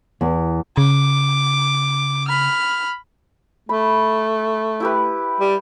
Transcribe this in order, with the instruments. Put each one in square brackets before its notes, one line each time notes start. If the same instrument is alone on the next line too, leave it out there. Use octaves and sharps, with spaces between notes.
[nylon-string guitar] E2
[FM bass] C#3 [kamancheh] D6
[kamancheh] B5 F6
[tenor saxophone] A3 [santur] B5
[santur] E4 G4 B4
[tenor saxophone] G3